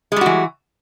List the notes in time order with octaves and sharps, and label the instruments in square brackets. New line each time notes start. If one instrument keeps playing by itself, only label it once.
[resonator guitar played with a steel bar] G#3
G3
F#4
E3